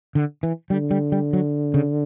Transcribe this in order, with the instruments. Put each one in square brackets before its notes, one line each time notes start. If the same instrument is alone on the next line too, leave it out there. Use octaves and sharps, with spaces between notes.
[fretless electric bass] D3
E3
[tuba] D3 [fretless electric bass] G3
[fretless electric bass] G3
G3
F#3
C#3